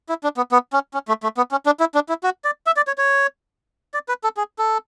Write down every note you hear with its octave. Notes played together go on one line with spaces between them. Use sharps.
E4
D4
B3
B3
C#4
C#4
A3
A3
B3
C#4
D4
E4
D4
E4
F#4
D5
E5
D5
C#5
C#5
D5
B4
A4
G#4
A4